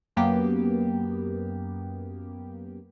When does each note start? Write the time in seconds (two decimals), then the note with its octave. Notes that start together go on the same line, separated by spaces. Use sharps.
0.16 F#2 A#3 B3 G4